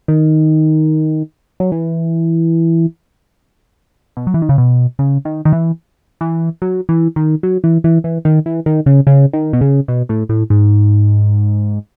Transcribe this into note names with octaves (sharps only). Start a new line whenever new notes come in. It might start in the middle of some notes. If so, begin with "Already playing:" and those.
D#3
F#3
E3
B2
F#3
E3
D#3
C#3
B2
C#3
D#3
D#3
E3
E3
F#3
E3
D#3
F#3
E3
E3
E3
D#3
E3
D#3
C#3
C#3
D#3
B2
C#3
B2
A2
A2
G#2